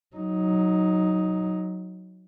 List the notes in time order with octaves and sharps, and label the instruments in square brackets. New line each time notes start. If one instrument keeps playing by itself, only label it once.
[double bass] F#3 D#4